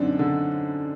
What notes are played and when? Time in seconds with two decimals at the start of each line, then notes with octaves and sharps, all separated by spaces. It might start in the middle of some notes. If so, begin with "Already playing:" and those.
Already playing: F#2 D3 C4 D4 D#4
0.19 D3